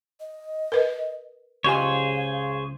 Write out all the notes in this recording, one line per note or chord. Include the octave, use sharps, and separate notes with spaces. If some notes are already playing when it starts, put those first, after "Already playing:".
D#5
A#4 B4
C#2 G4 G#4 C5 C#5 F5 G#5